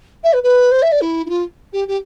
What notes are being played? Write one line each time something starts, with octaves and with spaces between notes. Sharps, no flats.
E5
B4
B4
C5
E5
D5
E4
E4
F4
G4
G4